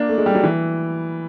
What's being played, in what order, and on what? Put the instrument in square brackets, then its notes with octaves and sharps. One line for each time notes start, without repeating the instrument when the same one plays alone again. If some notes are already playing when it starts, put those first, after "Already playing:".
Already playing: [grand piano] A#3 D4
A3
G#3
G3
F#3
E3